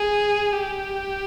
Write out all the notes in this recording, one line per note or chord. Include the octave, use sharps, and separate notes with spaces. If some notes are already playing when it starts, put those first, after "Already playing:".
Already playing: G#4
G4